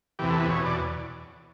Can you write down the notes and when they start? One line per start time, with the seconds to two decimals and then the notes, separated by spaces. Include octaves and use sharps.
0.19 E2 C3 E3 G4
0.30 A4
0.40 B4
0.50 E2 B2 C#5
0.66 D5